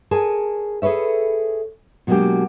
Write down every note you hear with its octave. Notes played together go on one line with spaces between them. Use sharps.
G#4 A#4 C#5 G#5 A5
G#4 A4 B4 C#5 E5
B2 F#3 G#3 A#3 D4 G4